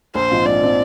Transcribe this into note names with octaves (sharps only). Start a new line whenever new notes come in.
A#1 C5
G#2 F3 C4 F4
A#1 D5
F3 C4 F4